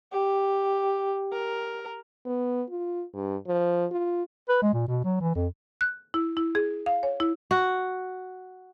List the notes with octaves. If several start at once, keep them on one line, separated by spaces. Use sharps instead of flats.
G4
A#4
B3
F4
G2
F3
F4
B4
G#3
A#2
B2
F#3
E3
F2
F#6
E4
E4
G#4
F5
C#5
E4
F#4